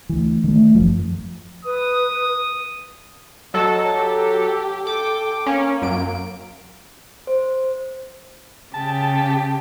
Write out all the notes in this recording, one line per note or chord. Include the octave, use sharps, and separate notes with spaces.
D2 E3
D#3 A3
G1 F#2 F3
B4 D#6
F#3 A4 D#5 A5
G4
A4 G5 D6
A#3 C#4
F#2 D7
C5
C#3 G4 A5